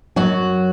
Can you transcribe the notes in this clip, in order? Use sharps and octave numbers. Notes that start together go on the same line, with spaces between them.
F#2 F#3 F#4